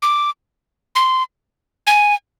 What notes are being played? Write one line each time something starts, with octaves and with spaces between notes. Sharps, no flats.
D6
C6
G#5